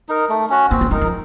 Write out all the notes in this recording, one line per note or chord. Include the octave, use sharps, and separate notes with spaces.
D#4 A#4
A3
C#4 F#4
A#3 C4
A#3
A3 D#4 A#4
F3